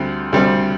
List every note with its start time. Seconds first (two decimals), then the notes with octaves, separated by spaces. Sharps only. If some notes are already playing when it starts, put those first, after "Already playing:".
Already playing: D2 D3 G3 C4
0.33 D2 D3 G3 C4